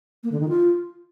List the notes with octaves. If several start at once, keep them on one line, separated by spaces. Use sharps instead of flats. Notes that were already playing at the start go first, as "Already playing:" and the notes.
A#3
D3
D#3
F4